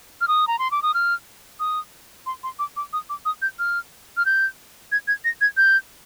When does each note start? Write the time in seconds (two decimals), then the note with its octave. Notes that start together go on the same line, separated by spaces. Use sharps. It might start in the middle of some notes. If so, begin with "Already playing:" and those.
0.21 F6
0.28 D#6
0.48 A#5
0.59 C6
0.71 D6
0.83 D#6
0.94 F6
1.60 D#6
2.26 C6
2.43 C6
2.59 D6
2.77 D6
2.93 D#6
3.09 D6
3.25 D#6
3.42 G6
3.59 F6
4.17 F6
4.26 G6
4.92 G#6
5.08 G#6
5.25 A#6
5.41 G#6
5.57 G6